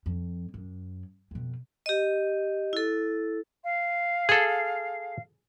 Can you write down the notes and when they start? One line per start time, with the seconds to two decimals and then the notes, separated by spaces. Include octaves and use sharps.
0.06 F2
0.54 F#2
1.31 F2 B2
1.86 G4 D#5
2.73 E4 A4
3.64 F5
4.29 G#4 A4